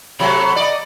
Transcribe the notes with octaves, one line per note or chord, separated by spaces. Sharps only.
C3 F#3 A3 B5
D5 D#5